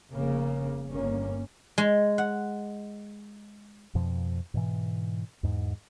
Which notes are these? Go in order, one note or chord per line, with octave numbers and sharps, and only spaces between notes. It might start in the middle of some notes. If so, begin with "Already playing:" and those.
F1 C#3 A#3
G1 A#3 C#4
G#3
F#5
F2 B2 F3
G#2 B2 E3
E2 G#2